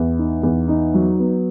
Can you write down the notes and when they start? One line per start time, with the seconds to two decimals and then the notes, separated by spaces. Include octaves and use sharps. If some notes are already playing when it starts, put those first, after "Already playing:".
Already playing: E2
0.18 D#4
0.43 E2
0.68 D#4
0.94 F#3
1.19 B3